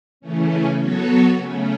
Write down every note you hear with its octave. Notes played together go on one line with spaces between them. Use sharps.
C#3 E3 A3 C#4
F#3 B3 F#4 A4 C#5
C#3 A3 C#4